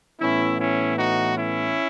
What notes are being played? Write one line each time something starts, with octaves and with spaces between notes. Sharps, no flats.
A2 E3 B3 C#4 E4
C#4 E4
D#4 F#4
C#4 E4